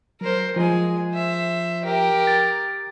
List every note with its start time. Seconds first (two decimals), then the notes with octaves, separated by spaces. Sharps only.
0.21 F#3 A#4 C5
0.56 F3 G#3 G#5
1.11 C5 E5
1.83 G4 A#4
2.27 A6